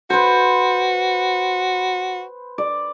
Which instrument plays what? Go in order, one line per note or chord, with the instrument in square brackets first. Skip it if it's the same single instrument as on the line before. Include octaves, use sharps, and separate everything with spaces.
[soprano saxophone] F#4 [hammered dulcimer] B4 C5
[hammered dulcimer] D5